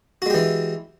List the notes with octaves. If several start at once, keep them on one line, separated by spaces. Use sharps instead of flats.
E3 G#3 F#4 G4